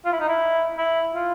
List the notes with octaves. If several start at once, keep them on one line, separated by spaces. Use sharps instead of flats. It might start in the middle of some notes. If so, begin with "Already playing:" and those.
F4
E4
D#4
E4
E4
F4